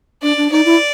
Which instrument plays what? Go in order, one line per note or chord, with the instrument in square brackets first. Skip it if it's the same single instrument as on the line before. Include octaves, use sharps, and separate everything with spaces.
[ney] D4 [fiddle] D5
[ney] D4
[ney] D#4 [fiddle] D5
[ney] E4